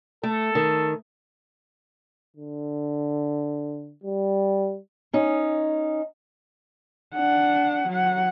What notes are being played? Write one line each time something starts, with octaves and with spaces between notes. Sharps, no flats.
A3 A4
D#3
D3
G3
C#4 D#4
D4 F#5
F#3 F#5